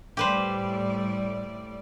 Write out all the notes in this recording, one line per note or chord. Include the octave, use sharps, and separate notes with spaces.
A2 G3 G4 B4 C5 D5